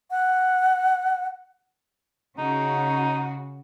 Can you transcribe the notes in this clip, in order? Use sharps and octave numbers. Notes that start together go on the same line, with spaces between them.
F#5
C#3 D#4 F#4